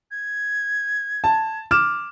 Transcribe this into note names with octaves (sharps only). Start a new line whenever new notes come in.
G#6
A5
D6 F6 E7